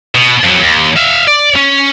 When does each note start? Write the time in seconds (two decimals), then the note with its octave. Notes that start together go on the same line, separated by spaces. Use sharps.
0.15 B2
0.44 F2 F#3
0.62 D#2
0.97 E5 F5
1.28 D5
1.56 C#4